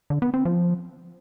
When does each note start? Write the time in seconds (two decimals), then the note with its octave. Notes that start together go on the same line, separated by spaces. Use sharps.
0.10 D3
0.22 B3
0.34 C4
0.45 F3